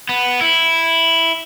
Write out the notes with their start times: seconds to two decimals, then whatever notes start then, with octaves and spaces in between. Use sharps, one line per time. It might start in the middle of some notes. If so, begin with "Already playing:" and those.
0.09 B3
0.41 E4